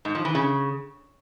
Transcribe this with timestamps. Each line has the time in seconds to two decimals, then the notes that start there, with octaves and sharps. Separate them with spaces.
0.05 G#2
0.15 F3
0.25 E3
0.35 C#3